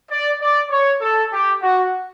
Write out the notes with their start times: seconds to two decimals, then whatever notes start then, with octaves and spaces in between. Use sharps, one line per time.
0.11 D5
0.41 D5
0.71 C#5
1.01 A4
1.33 G4
1.62 F#4